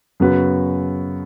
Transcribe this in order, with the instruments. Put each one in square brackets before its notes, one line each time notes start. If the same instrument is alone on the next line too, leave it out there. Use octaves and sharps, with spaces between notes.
[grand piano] F#2 C#3 B3 F#4 B4